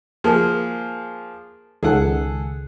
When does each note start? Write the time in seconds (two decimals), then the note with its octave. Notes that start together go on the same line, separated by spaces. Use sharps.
0.24 F3 A#3 G#4
1.83 C#2 D#3 G#4 A4 F#5